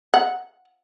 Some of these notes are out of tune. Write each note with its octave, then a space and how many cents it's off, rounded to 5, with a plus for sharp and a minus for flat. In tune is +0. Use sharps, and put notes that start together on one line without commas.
F#5 -10